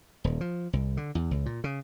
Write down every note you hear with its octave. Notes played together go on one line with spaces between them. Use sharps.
D#1
F3
C2
D3
E2
C#2
A#2
C#3